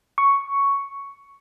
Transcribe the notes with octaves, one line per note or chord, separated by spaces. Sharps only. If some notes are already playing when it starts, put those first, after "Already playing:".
C#6